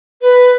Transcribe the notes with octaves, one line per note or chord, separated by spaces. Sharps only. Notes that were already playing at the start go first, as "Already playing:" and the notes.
B4